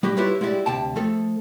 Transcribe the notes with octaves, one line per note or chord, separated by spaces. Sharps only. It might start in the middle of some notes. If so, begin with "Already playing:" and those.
G3 F#4 G4
E4 F4 G4 B4 C#5
G#3 E4 F#4 G4 D5
D2 C3 G5 A5
F3 A3 A4